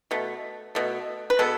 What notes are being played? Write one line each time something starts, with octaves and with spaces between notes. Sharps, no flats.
B2 A3
B2 A3
B4
B2 G#3 B3 A4